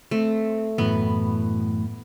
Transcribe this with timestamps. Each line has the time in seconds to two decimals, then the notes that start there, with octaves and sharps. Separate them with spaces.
0.11 A3 C4
0.78 F#2 A2 E3 B3